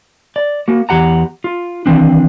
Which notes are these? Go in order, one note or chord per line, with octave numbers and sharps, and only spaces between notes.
D5
A#3 F#4
E2 G4 F#5 A#5
F4
D#3 E3 C4 D4